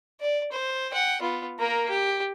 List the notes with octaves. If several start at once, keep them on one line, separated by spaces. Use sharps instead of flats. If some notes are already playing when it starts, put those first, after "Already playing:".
D5
C5
F#5 G5
B3 F4
A#3 A#4
G4